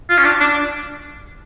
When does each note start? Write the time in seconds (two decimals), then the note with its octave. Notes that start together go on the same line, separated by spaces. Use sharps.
0.10 F4
0.18 C#4
0.25 D4
0.41 D4